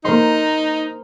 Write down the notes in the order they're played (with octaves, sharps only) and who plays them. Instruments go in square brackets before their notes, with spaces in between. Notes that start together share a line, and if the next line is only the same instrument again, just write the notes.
[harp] A#3 C5 C6 [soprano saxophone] D#4